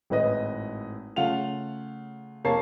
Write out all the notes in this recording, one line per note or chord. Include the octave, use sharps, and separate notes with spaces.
G#1 A2 B4 D#5
C#3 A3 F4 F#5 F7
F1 A#3 C#5 A5 C7